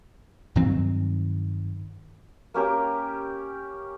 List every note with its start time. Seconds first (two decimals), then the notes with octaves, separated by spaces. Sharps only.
0.55 G2 D#3 F#3 C4
2.54 A#3 C#4 G4 A#4